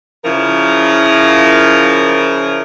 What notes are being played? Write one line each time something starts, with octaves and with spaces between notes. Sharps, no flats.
C#3 F3 E4 A#4